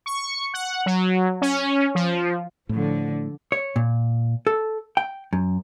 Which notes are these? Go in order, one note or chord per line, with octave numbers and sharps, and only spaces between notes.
C#6
F#5
F#3
C#4
F3
A2 D3 F3
C#5
A#2
A4
G5
F#2